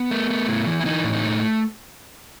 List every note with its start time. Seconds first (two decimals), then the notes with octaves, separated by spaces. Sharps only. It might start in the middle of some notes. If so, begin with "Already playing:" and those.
Already playing: B3
0.11 A3
0.30 A3
0.48 A2
0.67 E3
0.80 E4
0.86 E3 D#4
1.04 A2
1.13 D#4
1.23 A3